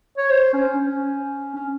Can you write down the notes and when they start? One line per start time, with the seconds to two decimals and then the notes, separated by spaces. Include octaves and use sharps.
0.18 C#5
0.30 C5
0.53 C#4
0.75 C#4
1.55 C#4